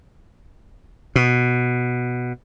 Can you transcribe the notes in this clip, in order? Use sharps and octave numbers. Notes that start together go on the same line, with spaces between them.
B2